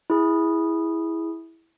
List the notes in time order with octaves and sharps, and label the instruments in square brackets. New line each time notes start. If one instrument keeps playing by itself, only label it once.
[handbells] E4 G#4